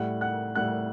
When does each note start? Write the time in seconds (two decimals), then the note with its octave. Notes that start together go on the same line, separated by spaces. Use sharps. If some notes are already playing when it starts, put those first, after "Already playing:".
Already playing: A2 G3 F#5 F#6
0.21 F#5 F#6
0.55 A2 G3 F#5 F#6